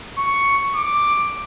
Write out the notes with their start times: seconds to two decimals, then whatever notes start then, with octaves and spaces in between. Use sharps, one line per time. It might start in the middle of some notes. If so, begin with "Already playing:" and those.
0.18 C#6
0.75 D6